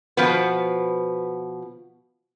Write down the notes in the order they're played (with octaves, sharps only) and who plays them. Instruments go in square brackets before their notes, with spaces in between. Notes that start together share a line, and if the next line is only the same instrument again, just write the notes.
[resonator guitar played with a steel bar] B2 F3 B3